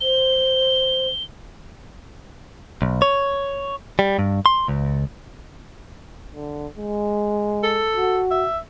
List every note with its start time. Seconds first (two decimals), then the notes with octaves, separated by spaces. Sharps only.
0.01 C5 G7
2.82 B1
3.02 C#5
3.99 G3
4.19 G2
4.46 C6
4.68 C#2
6.35 D3
6.77 G#3
7.63 A4
7.96 F#4
8.31 E5